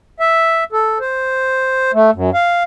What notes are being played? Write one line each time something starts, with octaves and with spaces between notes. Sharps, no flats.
E5
A4
C5
A3
F#2
F5